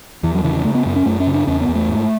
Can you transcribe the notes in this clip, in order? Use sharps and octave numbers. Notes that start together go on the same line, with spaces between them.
E2 E3
F#3
C#3 E3
E3
C#3 A3
B3
F#2 B3
C#4
F#2 A3
C#4
C#3
D4
E2 C#4
B3
E2
A3
G#2